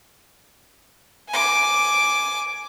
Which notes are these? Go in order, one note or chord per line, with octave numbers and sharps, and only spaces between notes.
G#5 D6